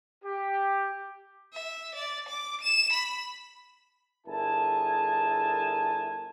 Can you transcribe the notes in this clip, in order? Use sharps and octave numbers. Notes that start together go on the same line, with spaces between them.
G4
E5
D5
D6
E7
B5
G1 E4 G#4 A#4 G#5 A5